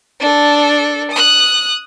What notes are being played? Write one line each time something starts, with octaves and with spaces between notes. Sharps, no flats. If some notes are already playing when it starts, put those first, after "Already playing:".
D4 A4
D#6 F#6